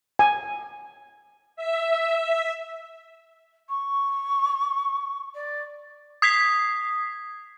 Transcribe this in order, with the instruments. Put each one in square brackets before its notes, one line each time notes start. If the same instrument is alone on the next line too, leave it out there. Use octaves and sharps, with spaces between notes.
[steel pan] G#5
[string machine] E5
[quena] C#6
D5
[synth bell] D#6 G#6 B6 C7